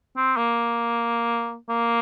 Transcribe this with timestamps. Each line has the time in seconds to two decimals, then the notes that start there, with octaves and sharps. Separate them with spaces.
0.17 C4
0.37 A#3
1.70 A#3